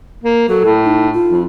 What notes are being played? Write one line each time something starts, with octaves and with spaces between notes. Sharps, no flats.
A#3
F#3 A4
A2
D#4
F4
F2